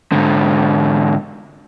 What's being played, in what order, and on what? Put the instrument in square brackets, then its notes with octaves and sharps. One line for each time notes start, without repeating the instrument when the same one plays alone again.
[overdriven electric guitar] G#2 D3